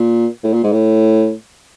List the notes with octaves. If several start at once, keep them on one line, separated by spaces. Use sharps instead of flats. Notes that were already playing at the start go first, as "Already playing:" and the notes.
Already playing: A#2
A2
A#2
G#2
A2